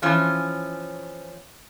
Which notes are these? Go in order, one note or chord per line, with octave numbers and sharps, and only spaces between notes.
E3 F3 C#4